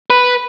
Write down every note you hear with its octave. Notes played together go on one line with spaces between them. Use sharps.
B4